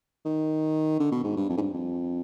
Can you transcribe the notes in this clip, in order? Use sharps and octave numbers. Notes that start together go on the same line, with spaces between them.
D#3
D3
B2
G#2
G2
F2
G#2
G2
F2